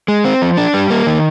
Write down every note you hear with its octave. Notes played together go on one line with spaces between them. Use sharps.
G#3
C4
F3
D4
G3
A#3
D#3